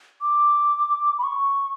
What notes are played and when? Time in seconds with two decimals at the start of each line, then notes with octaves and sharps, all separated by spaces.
0.22 D6
1.18 B5
1.23 C#6